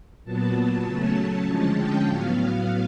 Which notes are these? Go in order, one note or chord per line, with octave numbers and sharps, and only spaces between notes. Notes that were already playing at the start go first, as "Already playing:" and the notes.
A#2 F#3 B3 A5
C#3 F#3 A3 C#4
D3 F3 G#3 C#4 A5
G5
A2 F#3 B3 F5